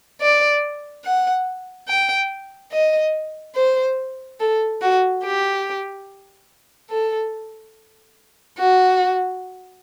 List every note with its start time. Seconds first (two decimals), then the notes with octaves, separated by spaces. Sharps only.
0.21 D5
1.05 F#5
1.88 G5
2.72 D#5
3.55 C5
4.40 A4
4.82 F#4
5.23 G4
6.90 A4
8.58 F#4